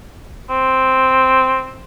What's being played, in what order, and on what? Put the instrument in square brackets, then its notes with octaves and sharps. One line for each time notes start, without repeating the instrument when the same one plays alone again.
[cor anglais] C4